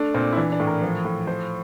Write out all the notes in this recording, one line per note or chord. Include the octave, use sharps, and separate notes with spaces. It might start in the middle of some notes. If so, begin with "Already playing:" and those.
Already playing: A3 D4
A#2 C4
E4
E3 D4
D4
A2
A#4
F3
A2
F3 C5